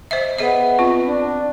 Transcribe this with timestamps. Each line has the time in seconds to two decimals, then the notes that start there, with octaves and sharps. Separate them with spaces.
0.11 C5 D#5 E5
0.39 B3 G#4 D#5 E5
0.79 C4 F4
1.06 D4